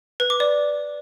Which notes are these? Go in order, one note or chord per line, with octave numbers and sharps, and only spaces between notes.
B4
D6
D5